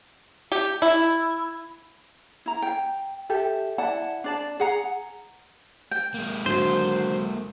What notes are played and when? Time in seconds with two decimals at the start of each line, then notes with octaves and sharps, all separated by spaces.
0.52 G4
0.82 E4
2.46 E4 A#5
2.62 G5
3.29 G4 A4 E5
3.78 E4 D5 F#5 A5
4.24 D4 D5 A5
4.60 G#4 F#5 A#5
5.91 G5
6.14 G#3 A#3
6.46 D3 F#3 C5